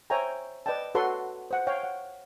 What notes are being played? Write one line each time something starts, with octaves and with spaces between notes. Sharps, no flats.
C5 C#5 E5 G5 G#5 A#5
B4 D5 D#5 G5 A5
F#4 A4 B4 C#5 F#5 C6
C5 F#5
C#5 F5 G5
F#5